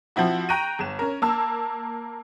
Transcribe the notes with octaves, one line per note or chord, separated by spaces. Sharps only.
F3 C4 E4 F#4
G5 A#5 C#6 F#6 A#6 D#7
G1 E7
C#4 A#4
A#3 A5 E6